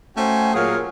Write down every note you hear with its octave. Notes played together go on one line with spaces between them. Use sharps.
A3 C#4 F#4 C5 G5 G#5
A#2 F#3 G#4 A#4 C#5 F5